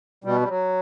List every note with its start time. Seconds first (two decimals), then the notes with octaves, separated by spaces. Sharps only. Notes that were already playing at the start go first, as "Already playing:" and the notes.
0.24 B2 G3
0.41 G3
0.48 F#3